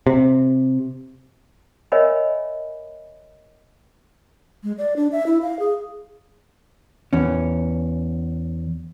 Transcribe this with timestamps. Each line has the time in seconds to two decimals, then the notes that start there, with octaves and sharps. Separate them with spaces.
0.07 C3
1.92 A#4 C#5 D#5 E5 G#5 B5
4.64 G#3
4.78 D5
4.96 D4
5.12 E5
5.26 E4
5.42 F5
5.59 G#4
7.13 E2 C#4